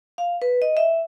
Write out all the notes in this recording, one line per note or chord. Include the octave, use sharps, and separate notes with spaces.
F5
B4
D#5
E5